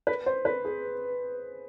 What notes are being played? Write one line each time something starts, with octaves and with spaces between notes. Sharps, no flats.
B4
C5
B4
G#4